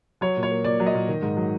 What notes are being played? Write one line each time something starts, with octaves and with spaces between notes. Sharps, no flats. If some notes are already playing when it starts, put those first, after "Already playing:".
F#3 C#5
A#2
C#5
A#3
A#2 D5
F#3
D#5
A#2
D#3
G#2
F#3